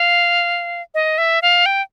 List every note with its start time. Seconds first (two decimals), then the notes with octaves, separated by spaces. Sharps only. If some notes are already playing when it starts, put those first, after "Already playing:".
Already playing: F5
0.94 D#5
1.18 E5
1.42 F5
1.66 G5